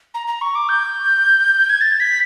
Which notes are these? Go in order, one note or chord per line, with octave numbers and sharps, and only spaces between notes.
A#5
A#5
C#6
D6
G6
G#6
A6
B6